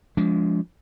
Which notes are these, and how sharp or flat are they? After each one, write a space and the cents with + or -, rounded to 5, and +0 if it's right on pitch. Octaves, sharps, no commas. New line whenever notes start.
F3 +0 G#3 +0 D4 -40